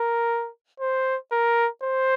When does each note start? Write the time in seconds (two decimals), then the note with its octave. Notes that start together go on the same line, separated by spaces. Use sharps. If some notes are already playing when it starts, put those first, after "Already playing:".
Already playing: A#4
0.80 C5
1.32 A#4
1.83 C5